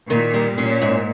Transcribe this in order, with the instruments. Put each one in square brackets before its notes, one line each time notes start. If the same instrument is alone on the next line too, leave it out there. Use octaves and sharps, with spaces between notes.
[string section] A#2 [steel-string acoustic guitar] D#3
[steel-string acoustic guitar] G3
[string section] A#2 [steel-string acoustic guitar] C#4
[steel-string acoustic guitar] G#2